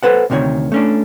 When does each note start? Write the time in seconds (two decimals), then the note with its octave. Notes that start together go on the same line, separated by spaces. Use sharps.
0.03 A4 B4 C5 F#5
0.30 D2 C3 D#3 F#4 C#5
0.72 A3 C#4 D4